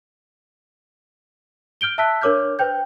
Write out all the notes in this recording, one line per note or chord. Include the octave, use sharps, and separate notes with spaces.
F6 G6 D7 G7
E5 A5 E6 F#6 B6
D4 A#4 C#5 D6 F6 G6
B4 C5 G5 G6